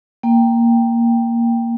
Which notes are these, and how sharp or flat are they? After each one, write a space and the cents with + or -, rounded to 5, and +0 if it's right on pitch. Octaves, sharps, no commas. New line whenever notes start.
A#3 +0 G5 +0